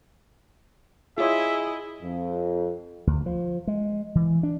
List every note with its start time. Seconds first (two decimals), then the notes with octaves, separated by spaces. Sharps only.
1.18 E4 F4 G#4 C#5 D#5 E5
2.02 F2
3.07 D2
3.26 F3
3.67 G#3
4.15 E3
4.43 D4